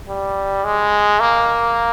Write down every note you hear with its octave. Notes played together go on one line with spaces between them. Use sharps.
G3
G#3
A#3